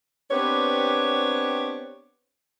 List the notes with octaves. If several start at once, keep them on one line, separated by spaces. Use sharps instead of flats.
B3 C4 D4 G4 B4 C#5